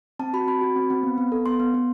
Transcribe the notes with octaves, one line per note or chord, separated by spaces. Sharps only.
C4 A5
F#4 B5
C4 B5
F#4
C4
C4
B3
B3
A4
B3 C6
B3
B3